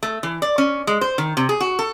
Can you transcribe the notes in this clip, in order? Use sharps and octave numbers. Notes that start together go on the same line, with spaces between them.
A3
E3
D5
C#4
G#3
C5
D#3
C3
G#4
F#4
A4